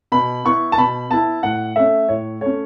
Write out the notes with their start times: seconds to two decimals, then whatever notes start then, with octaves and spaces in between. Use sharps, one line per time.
0.12 B2 B5
0.45 B3 E4 C#6
0.72 A5
0.78 B2 B5
1.10 B3 E4 A5
1.43 A2 F#5
1.76 A3 C#4 E5
2.09 A2 C#5
2.41 A3 C#4 C#5